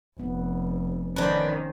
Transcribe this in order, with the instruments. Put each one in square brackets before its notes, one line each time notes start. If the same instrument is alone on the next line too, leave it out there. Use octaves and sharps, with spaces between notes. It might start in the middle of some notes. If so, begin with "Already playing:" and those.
[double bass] F1 [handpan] B3
[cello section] D#3 [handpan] C#4 C5 D5 [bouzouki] D4 B4